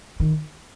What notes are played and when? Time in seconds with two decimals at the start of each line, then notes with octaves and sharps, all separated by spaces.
0.20 D#3